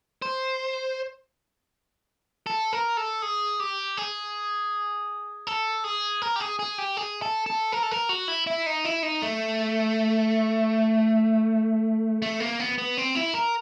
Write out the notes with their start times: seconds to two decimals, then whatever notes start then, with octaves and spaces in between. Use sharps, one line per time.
0.22 C5
2.47 A4
2.73 A#4
2.97 A4
3.22 G#4
3.60 G4
3.97 G#4
5.47 A4
5.84 G#4
6.22 A#4
6.36 G4
6.40 G#4
6.59 G#4
6.78 G4
6.97 G#4
7.22 A4
7.46 A4
7.72 A#4
7.83 A4
7.91 A#4
8.09 F#4
8.28 E4
8.47 E4
8.66 D#4
8.84 E4
9.03 D#4
9.22 A3
12.22 A3
12.40 A#3
12.59 B3
12.78 B3
12.97 C4
13.15 E4
13.34 A#4